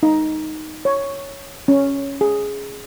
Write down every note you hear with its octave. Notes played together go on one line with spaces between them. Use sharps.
D#4
C#5
C#4
G#4